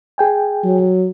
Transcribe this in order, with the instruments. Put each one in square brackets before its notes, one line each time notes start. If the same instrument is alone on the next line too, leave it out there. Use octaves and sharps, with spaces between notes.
[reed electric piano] G#4 G5 G#5
[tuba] F#3